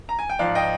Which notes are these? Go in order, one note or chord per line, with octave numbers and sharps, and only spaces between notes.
A#5
G#5
G5
G#2 F3 D5 F5
D#5 G5